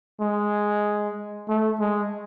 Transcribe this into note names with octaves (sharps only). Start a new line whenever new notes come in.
G#3
A3
G#3